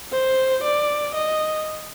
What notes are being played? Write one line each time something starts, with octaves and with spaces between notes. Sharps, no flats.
C5
D5
D#5